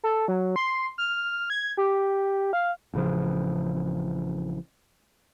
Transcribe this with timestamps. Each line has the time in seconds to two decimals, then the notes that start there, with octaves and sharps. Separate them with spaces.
0.04 A4
0.28 F#3
0.56 C6
0.98 F6
1.50 G#6
1.77 G4
2.53 F5
2.94 A1 C#3 F3